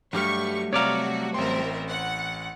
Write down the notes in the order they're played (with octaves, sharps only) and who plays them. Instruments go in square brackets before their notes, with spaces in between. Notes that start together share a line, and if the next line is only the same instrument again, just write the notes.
[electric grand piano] G2 G4 F6 [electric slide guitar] F#3 G3 A3 [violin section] C#6
[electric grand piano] C3 A#5 [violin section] F#4 [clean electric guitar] C#5 D5 F5
[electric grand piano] A1 C6 [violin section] C4 A#4 E5
[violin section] F#5